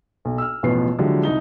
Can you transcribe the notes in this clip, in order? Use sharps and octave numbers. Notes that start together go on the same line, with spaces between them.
B1
E6 F6
A1 E2 B2 F3 B4 C7
D3 F3 F#3 G#3 E4 G4
C2 D#4 G7